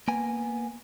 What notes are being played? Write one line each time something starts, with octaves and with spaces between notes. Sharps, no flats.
A#3 B3 G#5